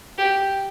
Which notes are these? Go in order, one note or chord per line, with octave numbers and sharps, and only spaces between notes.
G4